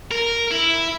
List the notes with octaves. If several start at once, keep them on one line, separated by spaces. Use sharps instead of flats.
A#4
E4